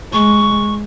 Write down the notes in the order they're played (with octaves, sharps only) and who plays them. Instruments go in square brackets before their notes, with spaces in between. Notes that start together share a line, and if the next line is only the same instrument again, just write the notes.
[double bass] G#3 [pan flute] C#6